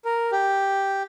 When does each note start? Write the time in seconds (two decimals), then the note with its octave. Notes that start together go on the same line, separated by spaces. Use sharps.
0.05 A#4
0.32 G4